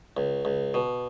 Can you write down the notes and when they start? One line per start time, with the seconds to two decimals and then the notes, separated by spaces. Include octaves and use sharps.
0.17 C#2
0.45 C#2
0.74 B2